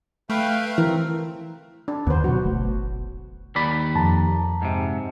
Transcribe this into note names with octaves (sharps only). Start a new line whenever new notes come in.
A3 B4 F5 G5
E3 C4 A#4
D4
D#2 D3 D#3 B3 C5
B2 F#3 F#4
D1 G1 A3
D#2 D5 B5
F2 A5 A#5
G#2 C3